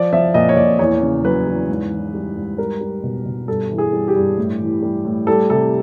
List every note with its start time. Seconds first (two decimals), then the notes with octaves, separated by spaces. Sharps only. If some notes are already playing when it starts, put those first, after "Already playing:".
Already playing: F3 D5
0.13 F3 E5
0.34 A#2 D#5
0.49 C#5
0.56 A#2 D5
0.79 E2 C#5
1.01 C#3
1.24 F#3 B4
1.46 E2
1.69 G#2
1.91 E3
2.14 G3
2.36 G#2
2.58 G3 A#4
2.81 G3
3.03 B2
3.26 B2
3.48 G2 A4
3.70 E3
3.78 G#4
3.93 G3
4.08 G4
4.16 G2
4.37 A2
4.60 E3
4.83 G3
5.05 A2
5.27 G3 A4
5.50 C3 A4